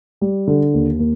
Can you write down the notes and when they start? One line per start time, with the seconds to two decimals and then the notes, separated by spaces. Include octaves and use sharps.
0.21 G3
0.47 D3
0.74 D#2
0.99 A#3